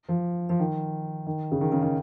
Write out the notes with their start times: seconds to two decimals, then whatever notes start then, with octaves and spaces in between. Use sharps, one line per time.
0.09 F3
0.49 F3
0.59 D#3
1.27 D#3
1.52 C#3
1.61 D#3
1.72 C#3
1.83 D#3